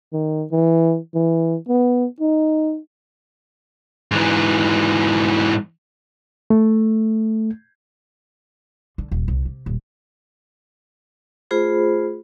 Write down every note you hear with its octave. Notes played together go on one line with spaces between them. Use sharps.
D#3
E3
E3
B3
D#4
G#2 E3
A3
D3
D#1
C2
C3
D#1
A3 F4 G#4 C5 B5